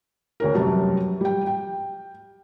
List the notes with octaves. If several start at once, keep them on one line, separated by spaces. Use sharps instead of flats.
D2 C#4 A#4
F1 F#2 F#3 G3 A5
G3 G5
G5